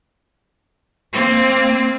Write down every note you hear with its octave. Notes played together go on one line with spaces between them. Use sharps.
A#3 C4